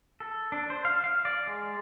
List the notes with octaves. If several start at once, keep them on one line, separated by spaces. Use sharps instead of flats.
A4
D4
C5
F5
F5
D5
G#3